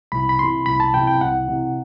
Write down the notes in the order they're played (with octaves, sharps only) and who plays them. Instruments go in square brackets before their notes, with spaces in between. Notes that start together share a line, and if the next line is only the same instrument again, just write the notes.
[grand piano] C2 [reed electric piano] B5
[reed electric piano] B5
[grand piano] C3 E3 [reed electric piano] C6
[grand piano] C2 [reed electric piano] B5
[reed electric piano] A5
[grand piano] C3 E3 [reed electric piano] G5
[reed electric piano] G5
[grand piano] C2 [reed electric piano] F#5
[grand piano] C3 E3